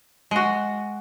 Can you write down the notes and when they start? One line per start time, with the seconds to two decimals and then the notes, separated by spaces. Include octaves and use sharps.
0.31 G#3 F#4